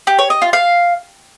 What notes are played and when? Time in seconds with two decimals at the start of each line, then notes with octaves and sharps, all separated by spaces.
0.07 G4
0.19 C#5
0.30 D#5
0.42 F4
0.53 F5